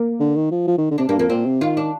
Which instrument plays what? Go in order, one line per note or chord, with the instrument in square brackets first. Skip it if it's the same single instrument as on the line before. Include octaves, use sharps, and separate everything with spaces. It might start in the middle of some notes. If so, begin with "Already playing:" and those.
Already playing: [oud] A#3
[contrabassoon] D3
D#3
F3
F3
D#3
D3
[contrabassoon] C3 [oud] D4
[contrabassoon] G2 [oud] A#3
[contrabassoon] F2 [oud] A#3
[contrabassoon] A#2 [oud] C4
[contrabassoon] C3
[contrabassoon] D#3 [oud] F4
[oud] D4